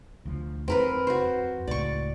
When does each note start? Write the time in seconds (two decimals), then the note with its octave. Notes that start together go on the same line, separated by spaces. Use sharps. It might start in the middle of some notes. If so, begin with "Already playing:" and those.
0.25 D2 F3
0.68 F2 C4 A#4 B4
1.07 F#4 C5
1.68 C#2 A2 D5 C#6